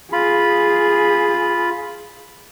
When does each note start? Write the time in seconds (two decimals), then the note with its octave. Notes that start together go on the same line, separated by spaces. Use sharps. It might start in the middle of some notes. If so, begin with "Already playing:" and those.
0.12 F4 G#4 B5